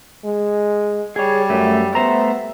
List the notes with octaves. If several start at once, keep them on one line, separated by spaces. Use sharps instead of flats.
G#3
G3 G#4 C#5
F#2 A3
A3 B3 C5 E5 A#5